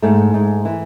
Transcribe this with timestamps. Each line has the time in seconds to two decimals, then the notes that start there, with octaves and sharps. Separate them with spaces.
0.02 G#2 A3
0.34 G#2
0.65 E3